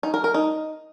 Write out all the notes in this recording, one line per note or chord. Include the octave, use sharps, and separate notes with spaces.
D#4
A#4
A#4
D#4